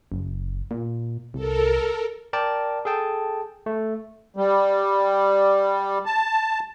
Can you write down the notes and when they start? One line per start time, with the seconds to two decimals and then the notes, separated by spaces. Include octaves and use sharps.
0.12 F#1
0.71 A#2
1.34 C2 A4 A#4
2.33 A#4 D5 G5 A5 A6
2.85 G#4 A4 G5 A5
3.66 A3
4.36 G3
6.06 A5